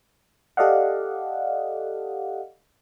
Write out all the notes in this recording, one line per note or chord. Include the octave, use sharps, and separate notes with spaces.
G4 A4 D5 D#5 F5 F#5